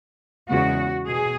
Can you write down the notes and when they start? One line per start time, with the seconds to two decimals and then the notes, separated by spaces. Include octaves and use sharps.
0.48 E2 C#3 G#3 B3 F#4
1.08 B2 G#4